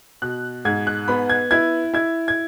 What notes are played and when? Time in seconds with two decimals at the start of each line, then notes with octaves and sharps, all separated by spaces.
0.22 B2 F#6
0.65 G#2 G#6
0.87 F#6
1.08 B3 B5
1.30 G#6
1.51 E4 G#6
1.94 E4 G#6
2.28 G#6